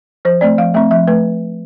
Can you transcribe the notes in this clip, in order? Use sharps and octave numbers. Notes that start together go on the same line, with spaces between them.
F3 C5
A3 C4 D5
F3 F5
A3 C4 E5
F3 E5
A3 B4